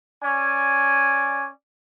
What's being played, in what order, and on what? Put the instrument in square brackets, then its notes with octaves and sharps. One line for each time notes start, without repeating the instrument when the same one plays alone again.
[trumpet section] C#4 D5 G#5